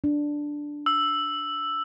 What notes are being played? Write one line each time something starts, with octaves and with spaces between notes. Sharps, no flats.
D4
E6